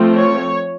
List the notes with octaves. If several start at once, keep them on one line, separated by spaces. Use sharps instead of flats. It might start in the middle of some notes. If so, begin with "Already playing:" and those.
Already playing: F3 A3 C4
C#5